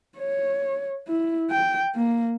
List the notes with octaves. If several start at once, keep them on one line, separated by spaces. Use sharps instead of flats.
C#5
E4
G5
A#3